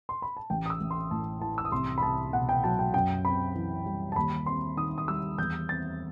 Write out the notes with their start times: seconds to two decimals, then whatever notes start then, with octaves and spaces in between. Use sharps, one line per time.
0.09 C6
0.22 B5
0.37 A5
0.50 A1 G5
0.66 D#6
0.70 E6
0.81 A1
0.91 C6
1.11 A2 A5
1.41 E3 A5
1.58 E6
1.65 D#6
1.72 C2 C6
1.98 B5
2.02 C2 A5
2.33 B2 F#5
2.49 G5
2.64 F#3 A5
2.79 G5
2.94 F#2 G5
3.25 C4 B5
3.55 E3
3.86 G3
4.12 A5
4.16 D#2 B5
4.46 C4 C6
4.77 D#3 D#6
4.98 D#6
5.08 G3 E6
5.38 E2 G6
5.69 C4 A6